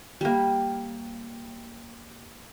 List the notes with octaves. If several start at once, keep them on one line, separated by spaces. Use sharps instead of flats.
G3 A#3